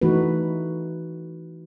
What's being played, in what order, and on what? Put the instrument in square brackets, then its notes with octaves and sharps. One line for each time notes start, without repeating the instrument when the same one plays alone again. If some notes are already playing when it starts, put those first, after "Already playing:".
[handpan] E3 A3 D#4 F#4 B4